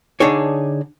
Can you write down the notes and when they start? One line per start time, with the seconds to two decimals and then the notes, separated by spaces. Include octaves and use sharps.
0.20 D3 D4 D#4 G#4 C#5